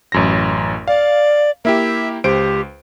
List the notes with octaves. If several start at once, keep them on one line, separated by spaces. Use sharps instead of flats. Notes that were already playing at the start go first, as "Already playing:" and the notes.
A1 F#2 A#6
D5 F5
A#3 E4 G4 E5
C#2 G4 C5 D7